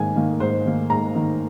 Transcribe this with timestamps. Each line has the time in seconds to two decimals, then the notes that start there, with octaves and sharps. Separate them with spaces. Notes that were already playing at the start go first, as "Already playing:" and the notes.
Already playing: G#2 D#3 A#3 G#5
0.16 D#3 A#3
0.40 G#2 C5
0.66 D#3 A#3
0.90 G#2 A#5
1.15 D#3 A#3